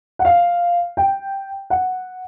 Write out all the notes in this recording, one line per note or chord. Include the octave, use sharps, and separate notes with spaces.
F#5
F5
G5
F#5